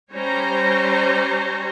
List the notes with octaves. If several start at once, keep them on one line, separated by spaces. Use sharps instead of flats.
G3 C#4 C5 C#5 A#5